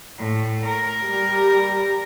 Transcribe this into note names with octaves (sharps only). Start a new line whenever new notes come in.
A2
A#4
G3